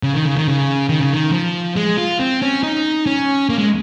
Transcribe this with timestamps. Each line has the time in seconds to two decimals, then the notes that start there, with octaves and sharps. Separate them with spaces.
0.03 C#3
0.13 D#3
0.25 C#3
0.36 D#3
0.48 C#3
0.89 D#3
1.00 C#3
1.12 D#3
1.32 F3
1.76 G#3
1.98 F4
2.19 C4
2.42 C#4
2.63 D#4
3.06 C#4
3.49 A#3
3.58 G#3